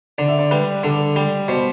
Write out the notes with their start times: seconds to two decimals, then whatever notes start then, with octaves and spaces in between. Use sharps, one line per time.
0.18 D3 D5
0.28 E5
0.39 D5
0.51 G3 B4
0.84 D3 A4
1.16 G3
1.48 B2 C5